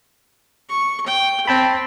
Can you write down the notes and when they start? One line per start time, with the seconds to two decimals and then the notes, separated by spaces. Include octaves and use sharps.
0.69 C#6
1.06 G5
1.47 C4 G5 A5 B5